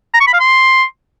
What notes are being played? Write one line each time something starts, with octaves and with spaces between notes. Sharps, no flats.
A#5
C#6
B5
F5
C6